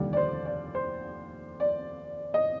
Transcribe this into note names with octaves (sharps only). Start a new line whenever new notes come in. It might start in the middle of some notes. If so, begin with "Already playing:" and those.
Already playing: F1 D#2 D3 G3
D5
C5
D5
C5
D5
D#5